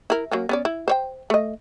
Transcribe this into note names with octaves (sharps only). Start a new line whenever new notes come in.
E4 A#4
F#3 A#3 C#4
B3 C#4 D5
E4
C5 C#5 G5
A3 D#5